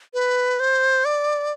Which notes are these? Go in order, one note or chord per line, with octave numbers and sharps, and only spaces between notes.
B4
C5
D5